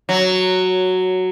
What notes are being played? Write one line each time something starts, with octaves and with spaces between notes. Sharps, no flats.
F#3